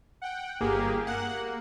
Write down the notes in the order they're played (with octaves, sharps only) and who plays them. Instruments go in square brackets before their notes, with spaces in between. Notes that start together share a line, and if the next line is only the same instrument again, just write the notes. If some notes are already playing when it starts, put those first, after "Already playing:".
[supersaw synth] F#5 G5
[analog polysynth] G1 A#3 [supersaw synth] G4 G#4
[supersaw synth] A#3 [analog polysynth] F#5